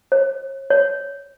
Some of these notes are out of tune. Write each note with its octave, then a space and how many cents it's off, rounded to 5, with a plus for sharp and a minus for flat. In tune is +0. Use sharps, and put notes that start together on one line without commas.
C#5 -40
C#5 +15